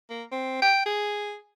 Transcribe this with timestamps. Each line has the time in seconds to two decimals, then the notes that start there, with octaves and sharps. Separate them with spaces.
0.10 A#3
0.31 C4
0.62 G5
0.86 G#4